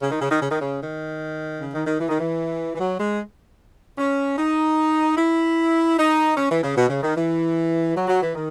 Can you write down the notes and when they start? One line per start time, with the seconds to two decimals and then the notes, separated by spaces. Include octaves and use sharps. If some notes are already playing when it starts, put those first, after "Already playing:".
0.01 C#3
0.11 D#3
0.21 C#3
0.30 D#3
0.41 C#3
0.50 D#3
0.60 C#3
0.81 D#3
1.59 C#3
1.73 D#3
1.86 D#3
1.99 E3
2.09 D#3
2.19 E3
2.75 E3
2.79 F#3
2.99 G#3
3.98 C#4
4.37 D#4
5.17 E4
5.97 D#4
6.36 C#4
6.50 E3
6.63 C#3
6.76 B2
6.89 C#3
7.02 D#3
7.16 E3
7.95 F#3
8.08 F#3
8.22 E3
8.35 D#3